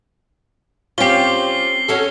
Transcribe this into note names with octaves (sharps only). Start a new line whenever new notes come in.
C4 C#4 F4 G4 C7 G7
C#4 F#4 A4